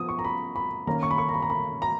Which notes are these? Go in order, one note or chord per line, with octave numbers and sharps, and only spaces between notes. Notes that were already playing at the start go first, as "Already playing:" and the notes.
Already playing: F3 B3 D#6
C#6
A#5
B5
B5
D#3 A#3 C#4 A#5
C#6
B5
C#6
A#5
B5
A#5
B5
A#5